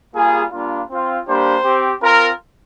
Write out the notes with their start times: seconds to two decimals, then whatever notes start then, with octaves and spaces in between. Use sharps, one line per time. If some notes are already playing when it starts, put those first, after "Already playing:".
0.15 G3 A#3 F4 G#4
0.52 G3 A#3 D4 F4
0.90 C4 F4
1.27 G3 A#3 D4 G4 C5
1.64 C4 G4
2.02 C4 F4 A#4